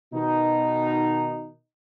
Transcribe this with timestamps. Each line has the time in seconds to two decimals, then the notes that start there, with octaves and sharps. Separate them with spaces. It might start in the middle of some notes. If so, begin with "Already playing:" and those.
0.13 B2 D#3 D#4